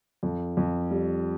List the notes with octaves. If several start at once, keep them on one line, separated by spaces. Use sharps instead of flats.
F2
F2
G3